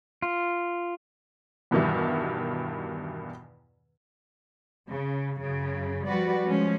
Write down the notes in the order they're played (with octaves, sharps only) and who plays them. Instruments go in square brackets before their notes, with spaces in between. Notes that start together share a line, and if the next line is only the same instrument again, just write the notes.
[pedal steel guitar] F4
[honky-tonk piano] E2 G2 B2 D#3 E3 G3
[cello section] C#3
F#2 C#3
F3 G3 F#4 B4 D5
F3 G#3 C#4